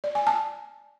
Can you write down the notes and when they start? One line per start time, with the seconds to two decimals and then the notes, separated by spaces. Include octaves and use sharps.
0.04 D5
0.15 G#5
0.27 A5